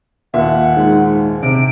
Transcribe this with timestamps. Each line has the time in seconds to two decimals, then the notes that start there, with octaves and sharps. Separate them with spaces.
0.34 D#2 A#2 E5 F#5
0.76 G#2
1.43 C3 D7